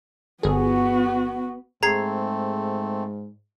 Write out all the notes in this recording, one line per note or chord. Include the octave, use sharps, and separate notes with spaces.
G1 B3 F#4 G#4
G#2 A3 C4 G#4 A#5 G#6 C7